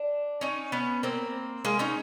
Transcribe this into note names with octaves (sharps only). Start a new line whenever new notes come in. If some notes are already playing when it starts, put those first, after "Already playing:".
Already playing: D4
C#4 D#4
B3 C#4
A#3 C4
G#3 A#3
C#4 D#4